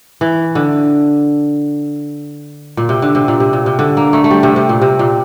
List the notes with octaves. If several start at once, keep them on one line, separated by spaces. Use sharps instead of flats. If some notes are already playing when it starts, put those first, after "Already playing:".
E3
D3
A#2
C3
D3
C3
A#2
C3
A#2
C3
D3
A#3
A3
A3
G3
C3
C3
A#2
C3
A#2